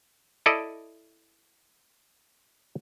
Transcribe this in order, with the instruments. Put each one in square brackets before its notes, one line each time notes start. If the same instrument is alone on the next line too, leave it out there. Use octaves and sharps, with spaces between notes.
[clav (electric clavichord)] E4 A4 D5 D#5